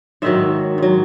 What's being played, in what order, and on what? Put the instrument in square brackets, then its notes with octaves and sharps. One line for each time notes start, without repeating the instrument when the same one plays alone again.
[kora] G#2 D#3 F#3 E5
G#2 F#3